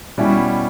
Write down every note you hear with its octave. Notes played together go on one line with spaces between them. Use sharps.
B2 G3 C#4 E4